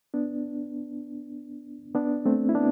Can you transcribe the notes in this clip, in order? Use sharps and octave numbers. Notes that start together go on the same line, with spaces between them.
B3 D4
B3 D4
A3 C4
E4
B3 D4